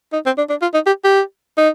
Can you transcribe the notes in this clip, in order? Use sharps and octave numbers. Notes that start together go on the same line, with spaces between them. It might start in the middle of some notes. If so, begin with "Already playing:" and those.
D#4
C4
D4
D4
F4
D#4
G4
G4
D#4